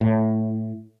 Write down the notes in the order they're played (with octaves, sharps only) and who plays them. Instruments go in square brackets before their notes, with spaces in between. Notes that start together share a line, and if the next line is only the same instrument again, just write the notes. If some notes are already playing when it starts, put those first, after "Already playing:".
[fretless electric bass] A2